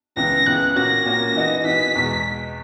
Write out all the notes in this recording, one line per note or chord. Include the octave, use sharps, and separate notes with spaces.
C#2 C#3 E3 B3 A#6
C#2 C#3 E3 B3 F#6
A#2 A#3 C#4 F#4 A#6
A#2 A#3 C#4 F#4
E3 B3 D#4 F#4
E3 B3 D#4 F#4 B6
E2 B2 G#3